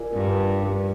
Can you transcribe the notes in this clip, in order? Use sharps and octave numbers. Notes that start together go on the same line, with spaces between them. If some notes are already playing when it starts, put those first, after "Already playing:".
Already playing: F4 A#4 D5 G#5
G2